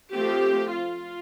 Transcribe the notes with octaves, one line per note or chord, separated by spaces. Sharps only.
F3 A3 C4 G4
F4